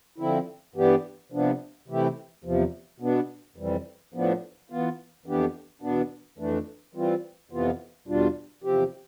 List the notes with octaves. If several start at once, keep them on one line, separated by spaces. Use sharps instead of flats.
D3 F3 C4 E4
G2 E3 B3 D4 G4
C3 F3 B3 D4
C3 E3 A3 E4 G4
E2 C3 F3
B2 B3 D4
F2 C3 E3 G3
A2 F3 B3 D4
E3 B3 F4
F2 E3 B3 D4 G4
E2 B2 B3 D4
F2 E3 A3 D4
E3 G3 C4 F4
F2 C3 E3 B3 F4
E2 B2 G3 D4 F4
E2 C3 F3 C4 G4